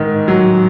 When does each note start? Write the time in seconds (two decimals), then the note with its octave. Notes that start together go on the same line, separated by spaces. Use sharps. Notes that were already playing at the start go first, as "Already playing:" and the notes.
Already playing: G#2 D#3
0.28 F#3